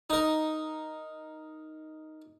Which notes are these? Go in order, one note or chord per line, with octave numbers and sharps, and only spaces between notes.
D#4 A#4